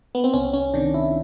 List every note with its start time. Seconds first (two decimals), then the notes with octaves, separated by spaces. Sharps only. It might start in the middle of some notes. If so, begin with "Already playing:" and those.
0.15 B3
0.24 C4
0.34 C2 C#4
0.53 C#4
0.74 C3 D#3 D4
0.94 E4